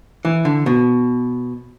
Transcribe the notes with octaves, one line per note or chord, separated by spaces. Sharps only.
E3
D3
B2